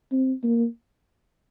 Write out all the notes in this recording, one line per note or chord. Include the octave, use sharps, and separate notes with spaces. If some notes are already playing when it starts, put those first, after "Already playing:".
C4
A#3